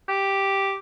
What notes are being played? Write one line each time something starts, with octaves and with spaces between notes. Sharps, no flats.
G4